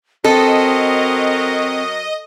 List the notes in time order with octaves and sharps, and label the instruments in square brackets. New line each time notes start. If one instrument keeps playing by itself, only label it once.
[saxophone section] F#3 F#4 A#4 [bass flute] C4 [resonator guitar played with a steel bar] A4 [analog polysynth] D#5